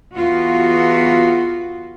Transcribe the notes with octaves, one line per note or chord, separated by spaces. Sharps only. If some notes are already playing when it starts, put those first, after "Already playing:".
E2 B3 F4 F#4